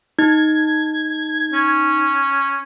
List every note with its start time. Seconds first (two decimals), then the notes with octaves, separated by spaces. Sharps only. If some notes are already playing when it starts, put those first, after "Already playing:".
0.19 D#4 G#6
1.53 C#4